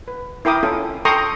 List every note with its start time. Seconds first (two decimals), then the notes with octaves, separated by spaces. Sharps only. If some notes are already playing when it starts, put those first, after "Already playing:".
0.08 B4
0.45 E4 A#4 G5 D6 D#6
0.63 C#4 F4 A4
1.05 A4 G5 A#5 C6 C#6 D#6